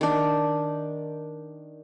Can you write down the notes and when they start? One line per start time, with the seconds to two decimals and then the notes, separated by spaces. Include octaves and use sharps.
0.01 D#3 D4